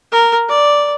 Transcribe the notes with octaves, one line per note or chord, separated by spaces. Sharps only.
A#4
D5